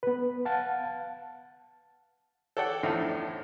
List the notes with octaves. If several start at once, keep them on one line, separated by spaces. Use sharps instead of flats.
B3 B4
F5 F#5 A5
A4 C#5 D5 F#5 G5
E2 A2 D3 F3 D#4